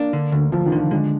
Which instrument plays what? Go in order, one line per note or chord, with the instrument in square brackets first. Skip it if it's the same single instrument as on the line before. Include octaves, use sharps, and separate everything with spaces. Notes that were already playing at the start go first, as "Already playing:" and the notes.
Already playing: [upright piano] A#3 [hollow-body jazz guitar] D4
[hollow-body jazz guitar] D3
D2
[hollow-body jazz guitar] D2 [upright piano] F3
[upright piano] D#3
[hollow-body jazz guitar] D3
[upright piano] F3
[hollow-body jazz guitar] D3 [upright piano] G#3